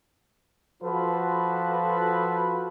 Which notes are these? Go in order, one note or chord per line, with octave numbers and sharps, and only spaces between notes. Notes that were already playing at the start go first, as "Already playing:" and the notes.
F3 F4 F#4 A4 B4